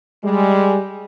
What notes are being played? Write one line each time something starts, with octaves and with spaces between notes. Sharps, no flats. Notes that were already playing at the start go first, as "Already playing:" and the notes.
G3 G#3